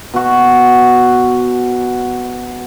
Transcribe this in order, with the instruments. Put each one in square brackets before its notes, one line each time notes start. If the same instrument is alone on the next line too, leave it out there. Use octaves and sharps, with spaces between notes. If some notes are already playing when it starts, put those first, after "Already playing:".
[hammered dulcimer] B2 F#4